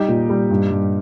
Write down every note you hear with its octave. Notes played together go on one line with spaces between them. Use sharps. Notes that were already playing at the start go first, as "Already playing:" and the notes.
Already playing: G3 D#4 G4
A#2
G3
G2
G2